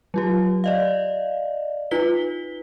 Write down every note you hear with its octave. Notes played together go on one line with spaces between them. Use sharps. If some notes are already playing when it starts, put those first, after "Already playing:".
F#3 F4 G4
D5 D#5 F5
D#4 F4 B4 B6 G7